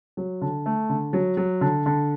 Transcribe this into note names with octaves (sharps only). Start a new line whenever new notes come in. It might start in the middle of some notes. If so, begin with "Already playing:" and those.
F#3
D3
A3
D3
F#3
F#3
D3
D3